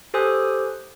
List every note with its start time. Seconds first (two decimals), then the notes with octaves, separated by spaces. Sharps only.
0.14 G4 A4 C5 G#5 D#6 F#6